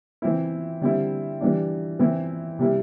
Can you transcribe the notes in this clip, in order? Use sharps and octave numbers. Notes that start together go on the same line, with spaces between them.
E3 C4 E4
D3 G3 C4 E4
E3 G3 D4
E3 C4 E4
C3 G3 E4